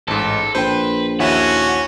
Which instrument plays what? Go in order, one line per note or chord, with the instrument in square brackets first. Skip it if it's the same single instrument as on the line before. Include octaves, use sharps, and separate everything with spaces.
[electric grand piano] A1 G#2 [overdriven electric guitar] A4
[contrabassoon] A#1 [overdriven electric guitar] B4 [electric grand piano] C5 G5
[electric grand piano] D#2 E4 E5 [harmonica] C#4 F#4 [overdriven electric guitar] D#4 F#5